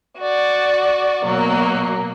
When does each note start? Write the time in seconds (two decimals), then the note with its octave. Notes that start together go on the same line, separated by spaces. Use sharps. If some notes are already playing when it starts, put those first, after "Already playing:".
0.18 F#4 D5
1.24 B2 F#3 A#3